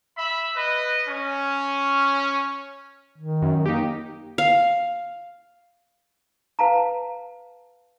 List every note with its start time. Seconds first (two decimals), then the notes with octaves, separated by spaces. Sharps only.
0.16 E5 B5
0.55 B4 D#5
1.06 C#4
3.18 D#3
3.42 F#2
3.66 A#3 D#4 G4
4.38 F5
6.59 B4 F5 A5 A#5